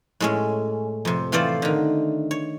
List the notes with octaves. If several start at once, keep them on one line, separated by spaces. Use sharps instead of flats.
A2 G#3 C#4
F2 C3
E3 A3 C4 F4 C5 D5
D3 D#3
C#5